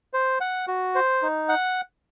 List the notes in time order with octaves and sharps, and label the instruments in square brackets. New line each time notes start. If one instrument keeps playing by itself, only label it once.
[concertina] C5
F#5
F#4
C5
D#4
F#5